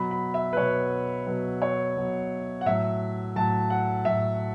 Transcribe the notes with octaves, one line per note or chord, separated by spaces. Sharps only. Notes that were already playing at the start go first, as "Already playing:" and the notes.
Already playing: B2 F#3 B5
B5
E5
B4
B2 F#3 C#5
B2 F#3 B4
C#5
B2 F#3
F#5
A2 F#3 E5
A2 F#3 A5
F#5
A2 F#3 E5